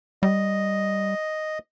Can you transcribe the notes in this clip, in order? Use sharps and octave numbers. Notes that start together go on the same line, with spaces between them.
G3 D#5